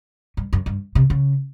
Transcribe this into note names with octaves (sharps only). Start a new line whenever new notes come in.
G2
F#2
G2
C3
C#3